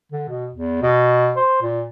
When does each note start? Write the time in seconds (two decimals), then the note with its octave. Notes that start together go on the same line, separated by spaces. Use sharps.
0.12 D3
0.28 B2
0.53 E2
0.82 B2
1.36 C5
1.62 A#2